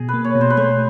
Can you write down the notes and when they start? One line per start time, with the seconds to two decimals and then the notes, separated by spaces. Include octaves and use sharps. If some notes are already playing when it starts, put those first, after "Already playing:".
Already playing: B2 G#4
0.09 B4
0.14 A#3
0.24 C#5
0.35 B2
0.41 C5
0.50 B4
0.57 A3 C5